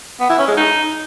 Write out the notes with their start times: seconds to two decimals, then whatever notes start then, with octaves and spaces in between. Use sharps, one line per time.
0.20 B3
0.29 E4
0.39 C#4
0.48 G#3
0.57 D#4